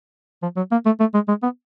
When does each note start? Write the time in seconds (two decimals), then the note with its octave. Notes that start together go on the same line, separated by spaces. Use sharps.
0.43 F3
0.57 F#3
0.72 A#3
0.86 A3
1.00 A3
1.14 G#3
1.28 G#3
1.43 B3